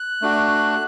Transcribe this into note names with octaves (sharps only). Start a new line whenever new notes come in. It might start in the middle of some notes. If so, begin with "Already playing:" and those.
Already playing: F#6
A3 D4 F#4